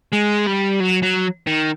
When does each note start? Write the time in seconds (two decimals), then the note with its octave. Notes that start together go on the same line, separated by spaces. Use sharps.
0.13 G#3
0.47 G3
0.80 F#3
1.03 F#3
1.47 D#3